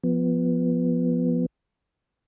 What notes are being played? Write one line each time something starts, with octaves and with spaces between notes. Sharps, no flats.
F3 B3